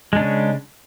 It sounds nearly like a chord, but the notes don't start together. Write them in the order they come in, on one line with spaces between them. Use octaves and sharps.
G#3 D4 C#3